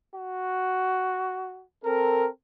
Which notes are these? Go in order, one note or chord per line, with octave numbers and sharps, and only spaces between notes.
F#4
C4 A4 A#4